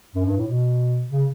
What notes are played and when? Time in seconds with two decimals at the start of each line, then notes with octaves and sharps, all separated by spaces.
0.15 F#2
0.26 G2
0.37 A2
0.47 B2
1.10 C#3